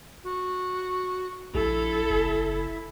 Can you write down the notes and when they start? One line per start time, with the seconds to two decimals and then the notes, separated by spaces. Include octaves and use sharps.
0.24 F#4
1.55 A#1 E4 A4
2.10 F#1